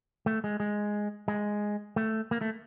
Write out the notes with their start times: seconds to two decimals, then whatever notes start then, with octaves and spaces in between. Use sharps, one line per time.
0.26 A3
0.44 G#3
0.60 G#3
1.28 G#3
1.96 A3
2.31 A#3
2.41 A3